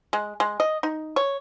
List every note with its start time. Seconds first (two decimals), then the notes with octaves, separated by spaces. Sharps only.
0.13 G#3
0.40 G#3
0.60 D#5
0.83 D#4
1.16 C#5